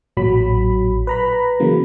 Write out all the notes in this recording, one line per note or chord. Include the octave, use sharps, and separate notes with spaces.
A1 A#2 F#3 B5
B4 A#5 B5
C#3 E3 F#3 A#3